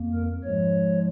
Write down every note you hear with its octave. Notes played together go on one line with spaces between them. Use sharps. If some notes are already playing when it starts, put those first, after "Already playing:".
Already playing: F2 A#3
A#4
G#2 F3 G#3 C#5